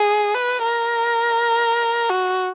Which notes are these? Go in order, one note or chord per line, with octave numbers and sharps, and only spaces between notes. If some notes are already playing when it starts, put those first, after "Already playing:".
Already playing: G#4
B4
A#4
F#4